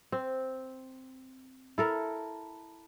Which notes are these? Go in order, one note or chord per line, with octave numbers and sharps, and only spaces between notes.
C4
E4 A4 A#4